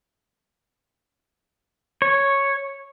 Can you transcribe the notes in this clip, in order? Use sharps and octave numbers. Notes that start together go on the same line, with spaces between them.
C#5